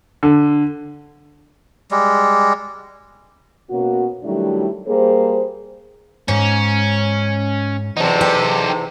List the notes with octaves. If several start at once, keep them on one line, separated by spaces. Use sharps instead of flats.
D3
G3 G#3
B2 A#3 C#4 F#4
D#3 F#3 G3 A3 D4 E4
G3 A#3 G#4 C5
G#2 C#4
E2 C3 D#4 A4
G4